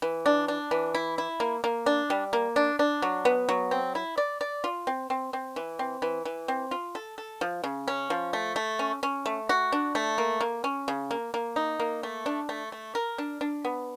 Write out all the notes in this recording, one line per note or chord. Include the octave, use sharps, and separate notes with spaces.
E3
D4
D4
E3
E4
E4
A#3
A#3
D4
G3
A#3
D4
D4
F#3
B3
F#3
C4
E4
D5
D5
F4
C4
C4
C4
E3
C4
E3
E3
C4
F4
A4
A4
F3
C#3
C#4
F3
A3
A3
C#4
C#4
A3
F#4
D4
A3
A#3
A#3
C#4
C#3
A#3
A#3
D#4
A#3
A3
D4
A3
A3
A#4
D4
D4
B3